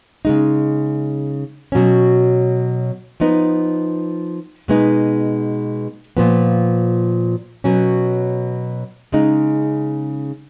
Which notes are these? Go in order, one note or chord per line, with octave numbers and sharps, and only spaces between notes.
C#3 G#3 D#4
B2 F#3 C#4
F3 B3 D#4
B2 G#3 B3 D#4
A#2 F3 B3
B2 F#3 C#4
C#3 G#3 D#4